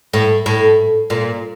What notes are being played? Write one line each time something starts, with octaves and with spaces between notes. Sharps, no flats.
A2
A2
A#2